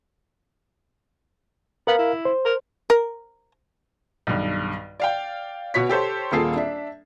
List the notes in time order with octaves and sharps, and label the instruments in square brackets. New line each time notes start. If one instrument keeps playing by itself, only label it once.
[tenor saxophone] B3 [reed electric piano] A#4 F5
[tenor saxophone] E4
[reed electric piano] C5
[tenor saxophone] A#4
[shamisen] A#4
[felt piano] B1 G2 D#3
D5 F5 G5
B2 F#4 C#5 B6
G4 A4 C5 C#5
D#1 A#3 F4 G#4 A4 C7
D4 E5